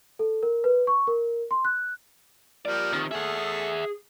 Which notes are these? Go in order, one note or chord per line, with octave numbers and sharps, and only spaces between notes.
A4
A#4
B4
C#6
A#4
C6
F#6
F3 A#3 G4 D5
C3 D#3
A3 G#4 E5 F#5